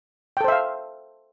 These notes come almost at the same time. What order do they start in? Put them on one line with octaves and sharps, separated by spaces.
G5 A4 C5 E5 F5